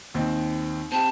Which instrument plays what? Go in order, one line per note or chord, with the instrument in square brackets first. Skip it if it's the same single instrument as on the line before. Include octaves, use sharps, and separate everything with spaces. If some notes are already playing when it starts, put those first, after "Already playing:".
[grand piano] D#2 C4 D#4
[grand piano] C4 G4 [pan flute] A5